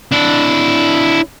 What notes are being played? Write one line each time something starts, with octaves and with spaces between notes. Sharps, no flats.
D4 E4